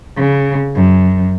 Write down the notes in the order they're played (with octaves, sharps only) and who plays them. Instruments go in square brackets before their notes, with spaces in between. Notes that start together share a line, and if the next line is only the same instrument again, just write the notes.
[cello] C#3
F#2